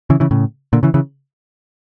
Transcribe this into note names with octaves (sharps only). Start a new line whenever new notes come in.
C#3 E3
C#3 E3
A2 C#3
A#2 D3
C#3 E3
C#3 E3